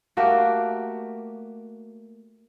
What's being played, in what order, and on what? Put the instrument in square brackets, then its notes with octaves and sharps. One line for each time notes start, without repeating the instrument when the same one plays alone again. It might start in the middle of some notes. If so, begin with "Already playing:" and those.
[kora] A3 A#3 F#4 G4